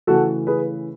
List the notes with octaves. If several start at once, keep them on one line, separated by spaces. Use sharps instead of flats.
C#3 E3 A3 F#4 A4
G#4 B4